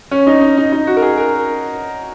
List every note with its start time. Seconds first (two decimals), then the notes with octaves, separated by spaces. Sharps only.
0.11 C#4
0.27 D#4
0.41 D#4
0.57 D#4
0.72 D#4
0.87 F#4
0.97 A#4
1.02 G#4
1.17 A#4